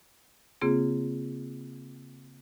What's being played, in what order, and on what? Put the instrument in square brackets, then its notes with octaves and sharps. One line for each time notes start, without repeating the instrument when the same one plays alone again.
[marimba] C#3 A#3 C4 F4 G#4